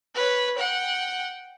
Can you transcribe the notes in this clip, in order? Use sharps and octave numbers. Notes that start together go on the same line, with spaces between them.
B4 C#5
F#5 G5